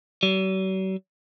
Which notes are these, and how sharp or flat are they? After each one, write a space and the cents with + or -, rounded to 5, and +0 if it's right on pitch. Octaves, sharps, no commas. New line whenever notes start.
F#3 +45